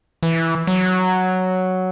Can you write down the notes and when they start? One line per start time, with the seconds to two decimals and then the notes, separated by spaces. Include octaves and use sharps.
0.23 E3
0.67 F#3